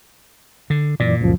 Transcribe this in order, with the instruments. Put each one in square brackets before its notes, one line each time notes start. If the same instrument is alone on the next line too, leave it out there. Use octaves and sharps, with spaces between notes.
[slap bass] D3
[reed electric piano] F#2 E3 D5 [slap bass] A#2
[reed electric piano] C#2 F#2 F3